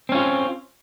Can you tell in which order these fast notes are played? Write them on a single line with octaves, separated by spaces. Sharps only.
C4 C#4 F4